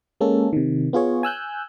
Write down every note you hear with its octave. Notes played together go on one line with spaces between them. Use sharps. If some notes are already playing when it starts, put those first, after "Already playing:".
G#3 A#3 C#4 A4
C3 D#3
B3 F4 G#4 C#5
G#5 E6 F#6 G6